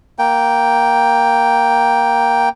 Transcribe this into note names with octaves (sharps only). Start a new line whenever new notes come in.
A#3 G5